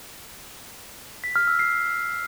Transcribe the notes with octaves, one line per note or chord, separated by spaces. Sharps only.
B6
F6
E6
C7